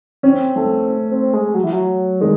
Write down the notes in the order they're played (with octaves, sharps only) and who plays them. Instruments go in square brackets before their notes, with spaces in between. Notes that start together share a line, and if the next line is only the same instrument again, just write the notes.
[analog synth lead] C4 [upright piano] C#4
[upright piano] A3
[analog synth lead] C4
G#3
F#3
E3
F#3
[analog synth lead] D#3 [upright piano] G#3